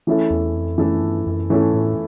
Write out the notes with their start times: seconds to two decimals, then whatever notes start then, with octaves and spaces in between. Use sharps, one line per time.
0.07 E3 A3 C#4 E4 A4
0.31 E2
0.55 F2
0.78 F#2 E3 A3 C#4 E4 A4
1.02 G2
1.27 F#2
1.50 G#2 E3 A3 C#4 E4 A4
1.73 A2